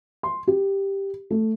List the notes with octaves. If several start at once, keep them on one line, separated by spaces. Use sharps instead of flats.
C6
G4
A3